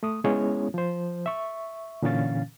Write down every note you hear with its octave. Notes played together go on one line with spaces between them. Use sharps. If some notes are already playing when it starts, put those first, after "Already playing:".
A3 D#6
G#3 B3 C#4 E4 G#4 C#5
F3 C5
E5 C#6
A#2 D3 E3 C#4 F5 A6